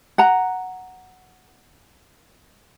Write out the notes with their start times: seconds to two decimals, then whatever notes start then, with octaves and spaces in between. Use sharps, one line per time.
0.18 F#5 A#5